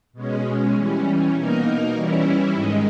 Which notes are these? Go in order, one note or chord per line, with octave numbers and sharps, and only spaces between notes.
B2 G#3 C#4
E3 G3 C#4
B2 A#3 D#4 A#4
E3 G3 C#4 E4
G#2 D#3 G#3 D#4